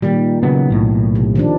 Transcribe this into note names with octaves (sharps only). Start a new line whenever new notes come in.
A#2 D#3 G3
C#3 F#3 B3
B1 A2
C3
D#3 F3 D4